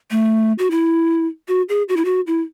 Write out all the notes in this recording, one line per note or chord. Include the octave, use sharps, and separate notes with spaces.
A3
F#4
E4
F#4
G#4
F#4
E4
F#4
E4